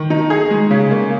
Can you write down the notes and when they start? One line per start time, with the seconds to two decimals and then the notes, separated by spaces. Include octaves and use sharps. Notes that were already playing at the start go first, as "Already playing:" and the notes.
Already playing: D#3
0.10 D#4
0.30 G#4
0.50 G#3
0.71 C#3
0.91 A#3